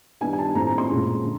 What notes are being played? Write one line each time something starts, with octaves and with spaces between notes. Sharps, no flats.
D#3 G3 B3 D4 G#5
G#5
A5
A2 F3 A3 C4 A#5
A#5
C6
A#2 F3 G#3 C#4
D3